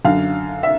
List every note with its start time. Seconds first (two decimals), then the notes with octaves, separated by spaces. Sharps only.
0.05 F#2 D3 F5
0.63 E5